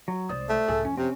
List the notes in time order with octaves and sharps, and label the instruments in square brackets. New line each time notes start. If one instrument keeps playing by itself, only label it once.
[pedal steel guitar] F#3
[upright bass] C2 G#3 [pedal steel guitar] C5 D5 D#6
[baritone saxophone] A3
[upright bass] C#2 A2 [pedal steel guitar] G#4 A4
[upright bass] F2 [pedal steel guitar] C#4
[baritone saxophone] C3 [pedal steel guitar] C4 C#4